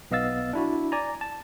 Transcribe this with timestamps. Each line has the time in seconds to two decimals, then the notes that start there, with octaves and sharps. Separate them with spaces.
0.11 B1 B3 D#5 F5 E6 A6
0.53 D4 E4 F#4
0.92 D5 G#5 A#5
1.21 A5